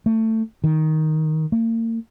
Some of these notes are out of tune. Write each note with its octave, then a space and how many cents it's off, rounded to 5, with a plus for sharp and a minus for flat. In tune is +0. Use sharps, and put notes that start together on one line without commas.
A3 +20
D#3 +5
A#3 -40